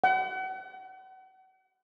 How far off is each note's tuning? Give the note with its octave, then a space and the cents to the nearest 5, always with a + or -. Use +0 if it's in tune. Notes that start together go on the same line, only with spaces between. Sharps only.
F#5 +40